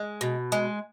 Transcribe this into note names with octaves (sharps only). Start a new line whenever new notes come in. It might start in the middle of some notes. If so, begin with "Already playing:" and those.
Already playing: G#3
B2
G#3